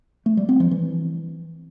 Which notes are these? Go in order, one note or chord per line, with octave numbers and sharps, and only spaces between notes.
A3
G3
C4
F3
E3